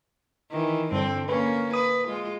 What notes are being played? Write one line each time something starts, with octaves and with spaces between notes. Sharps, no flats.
D#3 E3
G2 D3 C4
A#3 C#4 B4
B4 D#6
G#3 F4